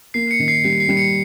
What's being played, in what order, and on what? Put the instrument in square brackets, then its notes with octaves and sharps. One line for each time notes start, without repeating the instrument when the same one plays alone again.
[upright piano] A#3 [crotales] C7
[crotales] C#7
[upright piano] D#3
[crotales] C7
[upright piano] G3 [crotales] C7
[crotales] C7
[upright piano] G3
[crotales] C#7